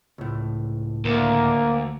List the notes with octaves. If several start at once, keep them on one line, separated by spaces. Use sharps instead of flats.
C#2 A2
D2 A#3